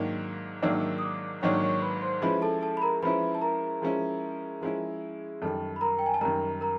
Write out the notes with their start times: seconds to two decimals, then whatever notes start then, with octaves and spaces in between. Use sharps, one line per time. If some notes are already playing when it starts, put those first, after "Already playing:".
Already playing: G#2 D#3 F#3 A#3 D4
0.62 G#2 D#3 F#3 A#3 D4 E5 E6
0.98 D#6
1.02 D5 D6
1.42 G#2 D#3 F#3 A#3 D4 C#5 C#6
1.62 C#5 C#6
1.82 B4 B5
2.02 C5 C6
2.22 F3 G#3 C#4 E4 B4 B5
2.42 A4 A5
2.62 A4 A5
2.77 B5
2.82 A#4 A#5
3.02 F3 G#3 C#4 E4 B4 B5
3.35 A5
3.41 A#4 A#5
3.82 F3 G#3 C#4 E4
4.62 F3 G#3 C#4 E4
5.42 F#2 D#3 G3 A4 A5
5.76 B5
5.81 A#4 A#5
5.99 G5
6.06 G#5
6.14 A5
6.21 F#2 D#3 G3 A#4 A#5
6.61 A#4 A#5